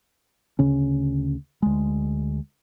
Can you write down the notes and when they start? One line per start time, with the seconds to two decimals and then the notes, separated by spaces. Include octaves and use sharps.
0.59 D2 C#3 C#4
1.62 D2 G#3